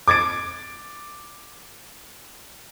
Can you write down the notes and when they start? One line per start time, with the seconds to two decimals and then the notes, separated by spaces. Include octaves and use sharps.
0.08 D6 G#6 A6 D7